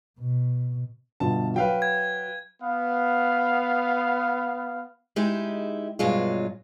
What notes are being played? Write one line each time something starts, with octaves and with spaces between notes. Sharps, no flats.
B2
G1 B2 F4 A5
F#3 B4 F5 G5
G#6
B3 F5
G#3 D#4 E4 G4
G2 B2 F#3 G#3 F4